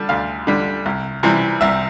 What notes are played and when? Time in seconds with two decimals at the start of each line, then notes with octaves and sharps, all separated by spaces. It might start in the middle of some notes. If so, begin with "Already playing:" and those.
Already playing: D3 G3 A5
0.09 D2 F5
0.47 D3 G3
0.86 C2
1.23 C3 E3 G3
1.61 C2 E5